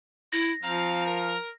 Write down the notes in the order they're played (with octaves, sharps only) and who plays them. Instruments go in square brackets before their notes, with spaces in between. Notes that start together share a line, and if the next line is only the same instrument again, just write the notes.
[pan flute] E4 [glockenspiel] A#6
[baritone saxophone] F3 [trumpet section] C4 F5 [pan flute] A#5
[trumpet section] A#4